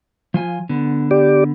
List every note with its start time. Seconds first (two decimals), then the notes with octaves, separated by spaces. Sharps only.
0.34 F3 F4 G#5
0.69 D3 B3
1.11 G4 D5